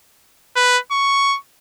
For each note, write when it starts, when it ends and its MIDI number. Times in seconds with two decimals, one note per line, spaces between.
0.56 0.78 71
0.92 1.38 85